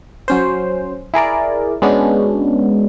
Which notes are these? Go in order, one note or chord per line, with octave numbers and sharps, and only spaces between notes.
F#3 C#4 C5
E4 G#4 A#4 D5
G#3 B3 C#4 D4 F#4